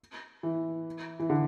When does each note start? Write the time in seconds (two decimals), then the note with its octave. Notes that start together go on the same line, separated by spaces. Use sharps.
0.43 E3
1.20 E3
1.30 D3